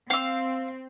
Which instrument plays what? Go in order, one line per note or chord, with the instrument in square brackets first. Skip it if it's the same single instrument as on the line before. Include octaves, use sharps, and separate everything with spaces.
[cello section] C4 [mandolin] F5 E6